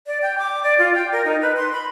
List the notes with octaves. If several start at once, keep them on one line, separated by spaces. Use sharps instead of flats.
D5
G5
D6
D5
F4
G5
A#4
D#4
B4
C6
B5